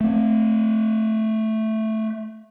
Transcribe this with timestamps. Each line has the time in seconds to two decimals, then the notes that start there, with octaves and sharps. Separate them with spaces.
0.01 A3 C4